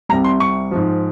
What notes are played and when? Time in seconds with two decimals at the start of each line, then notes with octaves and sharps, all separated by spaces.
0.09 C2 C3 G3 A#5
0.24 C6
0.40 C#6
0.71 G#2 F3